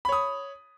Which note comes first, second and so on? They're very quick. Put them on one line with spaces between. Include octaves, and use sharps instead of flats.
B5 C#5 D#6